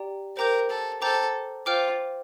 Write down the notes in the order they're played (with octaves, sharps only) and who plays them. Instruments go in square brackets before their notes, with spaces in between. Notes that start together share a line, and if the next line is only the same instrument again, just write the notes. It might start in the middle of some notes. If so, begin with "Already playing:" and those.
Already playing: [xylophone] G4 D5 G5 A#5
[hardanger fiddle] A#4 [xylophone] C5 G5 A#5 D6 G6
[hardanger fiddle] A4
[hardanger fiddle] A4 [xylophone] C5 G5 A#5 D6 G6
[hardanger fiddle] F4 [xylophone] C5 G5 D6 F6